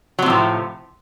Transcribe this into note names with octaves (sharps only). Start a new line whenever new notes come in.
A2 C3 F3 F#3